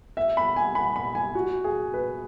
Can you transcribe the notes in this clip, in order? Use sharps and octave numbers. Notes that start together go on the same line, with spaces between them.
E5
B5
G#5
B5
B5
G#5
F#4
G#4
B4